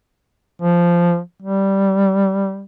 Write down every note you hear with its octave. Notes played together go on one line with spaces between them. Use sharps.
F3
G3